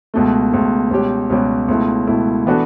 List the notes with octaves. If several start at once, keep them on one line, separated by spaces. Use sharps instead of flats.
C#2 B2 A3
C#2 B2 A3
C#2 B2 G3 C#4 G4
C#2 B2 G3 C#4 G4
C#2 B2 A3 E4
C#2 B2 A3 E4
E3 B3 D4 F#4 A4